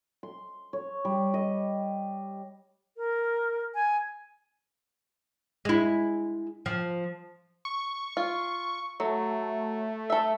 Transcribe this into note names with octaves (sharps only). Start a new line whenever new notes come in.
C6
C#5
G3
D#5
A#4
G#5
G#3 E4
F3
C#6
F4
F#3 A3
A4 E5